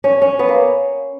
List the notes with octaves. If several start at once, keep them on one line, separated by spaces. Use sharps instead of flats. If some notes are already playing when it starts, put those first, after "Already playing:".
C#4
C#4
B3
A#3